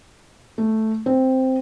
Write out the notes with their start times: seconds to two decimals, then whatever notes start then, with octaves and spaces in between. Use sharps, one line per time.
0.58 A3
1.06 C4